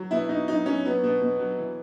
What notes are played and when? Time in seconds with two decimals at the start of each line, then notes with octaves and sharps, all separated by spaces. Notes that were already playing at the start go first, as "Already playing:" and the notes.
Already playing: F#3
0.11 B2 E4
0.29 B2 D#4
0.48 F#3 D#4
0.66 F#3 C#4
0.85 F#3 B3
1.03 B2
1.21 B2
1.40 F#3
1.58 E3